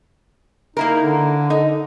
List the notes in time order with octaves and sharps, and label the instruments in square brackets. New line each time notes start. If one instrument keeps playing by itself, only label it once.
[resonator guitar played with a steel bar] A#3 E4 A#4 [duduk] D#4
[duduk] D3
[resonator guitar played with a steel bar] D#4